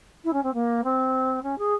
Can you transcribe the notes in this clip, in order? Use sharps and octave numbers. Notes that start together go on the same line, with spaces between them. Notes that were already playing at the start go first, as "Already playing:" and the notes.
E4
C#4
C4
A#3
C4
C#4
G#4